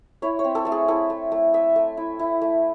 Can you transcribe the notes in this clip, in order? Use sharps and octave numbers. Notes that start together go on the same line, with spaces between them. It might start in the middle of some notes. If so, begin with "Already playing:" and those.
E4 C#5
C#5
C4
A4
A3 A4
G#4
E4 A4
A3
A3
A3 E5
A3
E4
E4
A3